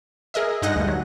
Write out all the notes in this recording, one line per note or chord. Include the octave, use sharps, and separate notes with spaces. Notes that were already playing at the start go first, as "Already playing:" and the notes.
G#4 A#4 D#5 E5
G2 G#3 D#4 D#5 F#5 A#6
D2 G2
F#3